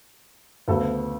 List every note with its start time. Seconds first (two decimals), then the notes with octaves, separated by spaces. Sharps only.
0.68 D2 C#3 F#3 B3 A4